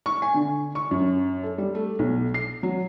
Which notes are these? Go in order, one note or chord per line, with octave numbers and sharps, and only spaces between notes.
C#6
G#5
D3
C#6
F#2
A4
G3
A3
B1
C7
F#3